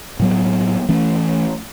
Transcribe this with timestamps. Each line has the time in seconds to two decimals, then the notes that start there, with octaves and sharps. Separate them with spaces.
0.19 A2 F#3 B3
0.89 E3 A3 C#4